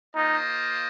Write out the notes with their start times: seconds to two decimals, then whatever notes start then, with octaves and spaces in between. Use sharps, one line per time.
0.15 A#3 D#4 F4 C5 D#5